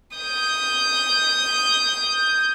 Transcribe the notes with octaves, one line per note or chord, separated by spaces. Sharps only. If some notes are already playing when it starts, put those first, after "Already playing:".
D#6 G6